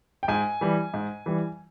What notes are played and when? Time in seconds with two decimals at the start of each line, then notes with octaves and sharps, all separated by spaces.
0.23 G5
0.28 G#2 G#5
0.61 E3 G3
0.94 G#2
1.26 E3 G3